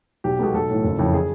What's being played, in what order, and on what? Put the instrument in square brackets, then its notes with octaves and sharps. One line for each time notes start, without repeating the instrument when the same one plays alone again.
[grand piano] B1 G4
B2 G#3 B3 A4
B1 A4
A2 E3
F#1
F2 C#3 E3
G#4